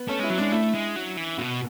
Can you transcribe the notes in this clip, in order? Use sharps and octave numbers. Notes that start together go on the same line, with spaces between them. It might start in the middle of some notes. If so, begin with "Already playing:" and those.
Already playing: B3
A3 C#4
G#3 E4
F#3
G#3 D4
A3 E4
G#3
F#3
E3
B2 F#4